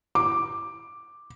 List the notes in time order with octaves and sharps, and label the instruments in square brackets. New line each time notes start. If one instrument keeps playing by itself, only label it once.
[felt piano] D6